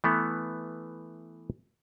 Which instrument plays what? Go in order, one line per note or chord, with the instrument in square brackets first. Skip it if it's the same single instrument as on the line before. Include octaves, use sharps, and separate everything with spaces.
[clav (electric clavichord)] E3 A3 B3